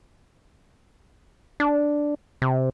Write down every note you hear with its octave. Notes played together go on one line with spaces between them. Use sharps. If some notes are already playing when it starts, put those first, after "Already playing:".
D4
C3